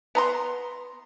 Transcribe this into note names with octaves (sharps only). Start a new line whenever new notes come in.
B3 A#5 C6